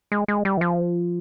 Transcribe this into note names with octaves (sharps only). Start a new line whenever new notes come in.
G#3
G#3
G3
E3
F3